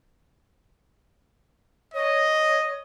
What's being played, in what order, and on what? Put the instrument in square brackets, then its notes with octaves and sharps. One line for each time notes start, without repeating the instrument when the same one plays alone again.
[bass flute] C#5 [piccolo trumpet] D#5